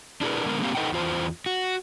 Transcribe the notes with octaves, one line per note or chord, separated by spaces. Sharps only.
D4 E4 G#4 A#4 B4
D3 G#3 B3 A#4
A3 A#3 C4 G4 F5
D#4 A4 B4 D#5 F#5 G5
E2 F4 C5
F#4